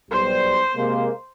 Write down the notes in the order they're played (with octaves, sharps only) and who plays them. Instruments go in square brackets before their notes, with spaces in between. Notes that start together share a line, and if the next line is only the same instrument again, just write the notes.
[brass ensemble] B1 G3 [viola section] C5
[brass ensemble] C3 G#3 A#3